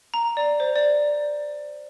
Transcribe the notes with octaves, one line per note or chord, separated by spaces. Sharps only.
A#5
D5
C5
D5